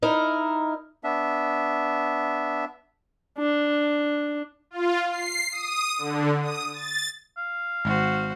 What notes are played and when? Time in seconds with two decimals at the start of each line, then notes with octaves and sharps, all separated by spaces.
0.02 D#4 E4 A#4
1.04 B3 D4 E5
3.38 D4
4.71 F4
5.10 C7
5.52 D#6
5.98 D3
6.43 D#6
6.73 A6
7.37 F5
7.85 G#1 F#4 C5